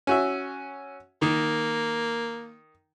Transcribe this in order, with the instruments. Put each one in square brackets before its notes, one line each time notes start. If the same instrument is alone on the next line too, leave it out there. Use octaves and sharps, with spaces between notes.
[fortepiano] C#4 F#4 E5
[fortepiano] D#3 [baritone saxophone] A#3